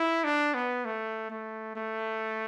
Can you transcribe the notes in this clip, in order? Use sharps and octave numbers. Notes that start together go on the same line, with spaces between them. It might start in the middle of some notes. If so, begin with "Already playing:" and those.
Already playing: E4
D4
B3
A3
A3
A3